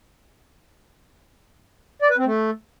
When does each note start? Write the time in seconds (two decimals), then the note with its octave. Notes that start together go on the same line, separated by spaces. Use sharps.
2.02 D5
2.10 B4
2.18 C4
2.26 A3